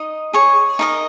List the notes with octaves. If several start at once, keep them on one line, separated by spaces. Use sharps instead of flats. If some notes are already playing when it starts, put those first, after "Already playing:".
Already playing: D#4 D#5
G#4 C#5 C#6
D#4 A#4 D#5